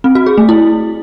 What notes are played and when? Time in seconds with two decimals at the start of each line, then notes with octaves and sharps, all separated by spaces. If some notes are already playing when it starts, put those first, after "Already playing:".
0.04 C4
0.15 F#4
0.26 G#4
0.38 A3
0.49 E4